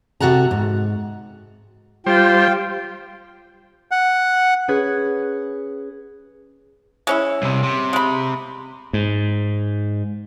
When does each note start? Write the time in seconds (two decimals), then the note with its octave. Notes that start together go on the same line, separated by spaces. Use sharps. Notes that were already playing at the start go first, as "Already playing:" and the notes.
0.20 C3 F#4 A4 F#5 A#5
0.51 G#2
2.06 G3 F4 C5 G5
3.91 F#5
4.68 C#4 G#4 B4 G#6
7.07 G#3 C#4 E4
7.42 C2 C3
7.63 C3
7.93 G#3 B5
8.93 G#2